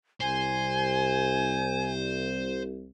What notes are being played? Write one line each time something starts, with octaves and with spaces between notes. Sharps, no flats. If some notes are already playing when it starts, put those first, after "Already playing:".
C2 C5 G#5